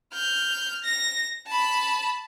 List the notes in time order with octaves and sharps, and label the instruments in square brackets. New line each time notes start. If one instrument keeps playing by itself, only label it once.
[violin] F6 G6
A#6
A5 B5